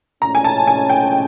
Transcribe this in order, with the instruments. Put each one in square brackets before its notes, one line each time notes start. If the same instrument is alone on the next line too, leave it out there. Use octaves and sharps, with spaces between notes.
[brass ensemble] A2 F3 G#3 C#4 [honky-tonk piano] A#5
[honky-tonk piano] G#5
A5
G#5
G5